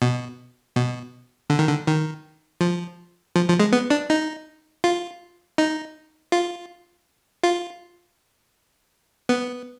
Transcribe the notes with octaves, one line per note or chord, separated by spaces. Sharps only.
B2
B2
D3
D#3
D3
D#3
F3
F3
F3
G#3
B3
D4
D#4
F4
D#4
F4
F4
B3